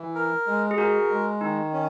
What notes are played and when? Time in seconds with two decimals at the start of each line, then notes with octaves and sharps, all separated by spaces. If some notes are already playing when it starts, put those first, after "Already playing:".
Already playing: E3
0.15 A#4
0.47 G#3
0.71 G#4
0.78 F#4 A#4
1.10 G#3
1.41 D#3 D#4
1.73 C#4